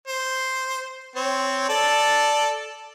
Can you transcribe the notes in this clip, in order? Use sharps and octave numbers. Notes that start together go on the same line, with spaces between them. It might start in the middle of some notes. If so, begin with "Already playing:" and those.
C5
C4 C#5
A4 D5